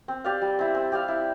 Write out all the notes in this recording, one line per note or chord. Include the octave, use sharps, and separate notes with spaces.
C4
G4 D5 F5
G3
C4 E4
C4
G4 D5 F5
E4